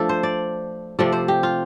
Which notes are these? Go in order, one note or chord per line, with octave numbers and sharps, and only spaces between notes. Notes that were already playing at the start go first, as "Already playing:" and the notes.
Already playing: F3 A3 D4 A4
C5
D5
C3 F3 A3 D5
C5
G4
F4